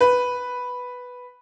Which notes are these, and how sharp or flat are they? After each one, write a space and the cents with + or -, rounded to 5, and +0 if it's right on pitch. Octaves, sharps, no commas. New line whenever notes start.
B4 +0